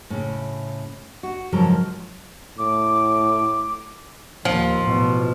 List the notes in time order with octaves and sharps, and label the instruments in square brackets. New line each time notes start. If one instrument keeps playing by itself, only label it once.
[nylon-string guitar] A2 C#3
F#4
G#2 C#3 F3 F#3 A4 A#4
[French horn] A2 [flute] D6
[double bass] D#2 [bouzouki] F3
[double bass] A1 B2